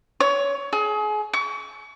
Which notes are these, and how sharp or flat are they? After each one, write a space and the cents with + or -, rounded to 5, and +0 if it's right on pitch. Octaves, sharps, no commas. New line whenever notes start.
C#5 +20
G#4 +30
C#6 +35